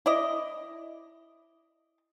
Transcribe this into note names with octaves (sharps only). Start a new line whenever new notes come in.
E4 D5 D#5